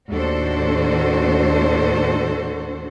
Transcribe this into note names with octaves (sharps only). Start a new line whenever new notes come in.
D#2 A2 D4 F#4 A4 C5